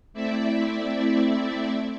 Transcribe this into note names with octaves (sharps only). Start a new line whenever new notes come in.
A3 C4 E4 D5 E5